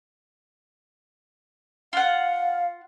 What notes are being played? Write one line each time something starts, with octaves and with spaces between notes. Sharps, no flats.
F4 F5 F#5